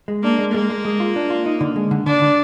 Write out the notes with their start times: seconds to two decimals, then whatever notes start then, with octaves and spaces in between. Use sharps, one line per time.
0.08 G#3
0.23 A#3 D4
0.39 G#3
0.54 G#3 A#3
0.70 G#3
0.85 G#3
1.00 F4
1.16 D4
1.30 F4
1.46 D#4
1.61 D3
1.76 G#3
1.91 D3
2.06 D3 D4
2.22 D3